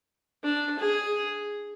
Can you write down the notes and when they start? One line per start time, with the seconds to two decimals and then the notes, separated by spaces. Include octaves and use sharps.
0.44 D4
0.79 G#4